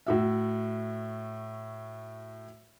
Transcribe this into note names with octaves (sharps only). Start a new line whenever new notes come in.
A2 F#4 E5